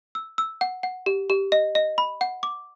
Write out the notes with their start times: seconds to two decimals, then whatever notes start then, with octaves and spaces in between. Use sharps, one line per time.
0.15 E6
0.38 E6
0.61 F#5
0.83 F#5
1.06 G4
1.30 G4
1.52 D#5
1.75 D#5
1.98 B5
2.21 F#5
2.43 D6